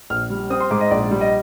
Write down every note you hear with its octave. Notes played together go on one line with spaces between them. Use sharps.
A#1 F6
G3
C4 D#6
C6
G#2 D6
D#5
A#1 D5
G3
D#5